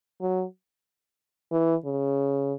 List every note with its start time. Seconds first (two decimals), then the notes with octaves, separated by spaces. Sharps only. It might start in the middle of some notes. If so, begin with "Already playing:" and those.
0.21 F#3
1.52 E3
1.85 C#3